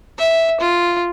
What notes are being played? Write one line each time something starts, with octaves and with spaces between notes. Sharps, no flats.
E5
F4